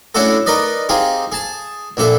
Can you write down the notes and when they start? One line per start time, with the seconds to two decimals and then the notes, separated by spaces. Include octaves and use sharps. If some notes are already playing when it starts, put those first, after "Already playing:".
0.15 A3 C#4 D4 E4 F#4 A4
0.46 D#4 A#4 B4 D5 D#5
0.89 C4 D#4 F4 G4 G#4
1.32 G#4 A5
1.97 A#1 D4 A4 E5